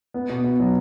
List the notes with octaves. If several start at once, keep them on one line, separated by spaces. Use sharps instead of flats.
B3
B2
B2
F#3